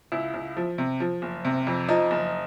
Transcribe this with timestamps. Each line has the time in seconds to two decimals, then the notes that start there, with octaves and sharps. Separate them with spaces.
0.12 C#2 E4
0.34 C#2
0.57 F3
0.78 C3
1.00 F3
1.22 F#1
1.45 C3
1.67 F2
1.89 F3 D#4
2.11 F#1